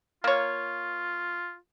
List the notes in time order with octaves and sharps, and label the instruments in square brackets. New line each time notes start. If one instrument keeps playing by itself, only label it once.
[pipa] A#3 C#5 [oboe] F4